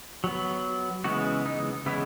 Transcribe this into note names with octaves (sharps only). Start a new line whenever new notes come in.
F#3 B3
C#3 E3 G#3 B3 F#4
D#4
C#3 E3 G#3 B3 E4